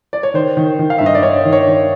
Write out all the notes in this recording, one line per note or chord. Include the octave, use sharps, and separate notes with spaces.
D5
C#5
D#3 C5
D#3
D#3
F5
G2 E5
D#5
D5
G2 C#5
D#3
C#5
D#3